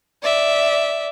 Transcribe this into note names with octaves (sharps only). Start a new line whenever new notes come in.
D5 E5